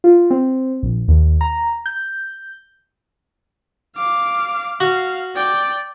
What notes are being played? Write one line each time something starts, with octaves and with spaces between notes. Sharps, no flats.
F4
C4
A#1
D#2
A#5
G6
F5 D6
F#4 F5
D5 G5